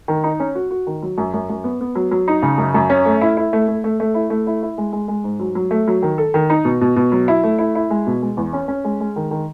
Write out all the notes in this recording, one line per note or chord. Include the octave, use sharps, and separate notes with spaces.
D#3
D#4
C#4
F#4
F#4
D#3
F#3
F#2
F#2
F#2
B3
B3
F#3
F#3
D#4
C#3
F#2
F#2
C#4
A3
E4
E4
A3
A3
A3
A3
E4
A3
E4
E4
G#3
G#3
G#3
G#2
F#3
F#3
A3
F#3
D#3
A4
D#3
D#4
B2
B2
B2
F#3
E4
A3
E4
E4
G#3
B2
G#3
E2
C#4
C#4
G#3
G#3
D#3
D#3